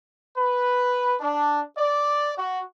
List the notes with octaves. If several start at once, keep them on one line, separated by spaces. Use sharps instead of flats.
B4
D4
D5
F#4